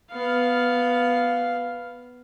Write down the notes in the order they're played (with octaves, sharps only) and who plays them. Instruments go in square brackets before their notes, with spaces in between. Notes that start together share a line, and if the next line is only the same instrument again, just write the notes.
[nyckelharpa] B3 F5